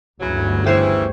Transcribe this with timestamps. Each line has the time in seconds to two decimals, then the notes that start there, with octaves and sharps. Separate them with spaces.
0.20 G1 D2 C#3 E3 F#3
0.64 C#3 E3 G4 C5 C#5